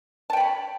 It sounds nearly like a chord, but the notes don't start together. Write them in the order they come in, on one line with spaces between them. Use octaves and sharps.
A5 G5 B5 C#5